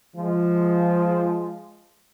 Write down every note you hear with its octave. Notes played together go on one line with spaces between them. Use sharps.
F3 G#3